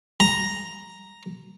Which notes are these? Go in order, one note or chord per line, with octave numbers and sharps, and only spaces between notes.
A#5